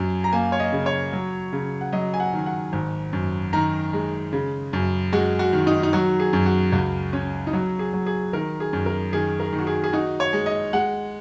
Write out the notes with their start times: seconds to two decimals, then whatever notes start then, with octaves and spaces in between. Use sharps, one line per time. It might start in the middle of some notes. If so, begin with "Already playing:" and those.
Already playing: F#2 F#3 G#5
0.24 A#5
0.33 A#3 G#5
0.52 C#5
0.60 D#5
0.72 C#3
0.86 C#5
1.13 F#3
1.53 C#3
1.81 F#5
1.92 F#3 D#5
2.14 G#5
2.20 F#5
2.33 D#3
2.46 F#5
2.73 G#1
3.13 F#2
3.53 D#3 A#5
3.93 G#3
4.33 C#3
4.73 F#2
5.12 G#3 F#4
5.39 F#4
5.53 D#3
5.67 D#4
5.83 D#4
5.93 F#3 F#4
6.20 G#4
6.33 F#2
6.46 F#4
6.72 C#2 F#4
7.13 C#4
7.47 D#4
7.53 F#3 F#4
7.79 G#4
7.93 F#3
8.06 G#4
8.33 D#3 A#4
8.60 G#4
8.73 F#2
8.86 A#4
9.13 D#3 G#4
9.40 A#4
9.52 D#3
9.59 F#4
9.67 G#4
9.84 G#4
9.93 D#4 F#4
10.20 C#5
10.33 G#3
10.46 D#5
10.73 G#3 F#5